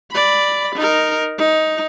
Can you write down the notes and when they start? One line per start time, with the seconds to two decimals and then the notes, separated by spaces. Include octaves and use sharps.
0.12 D5 B5
0.76 D#4 A#4
1.38 D#4